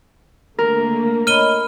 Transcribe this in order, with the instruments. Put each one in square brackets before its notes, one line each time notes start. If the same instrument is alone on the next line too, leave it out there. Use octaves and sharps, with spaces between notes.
[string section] D3 A3 A#3 [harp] A#4
[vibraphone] C#5 D#5 B5 [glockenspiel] F6 D#7 G7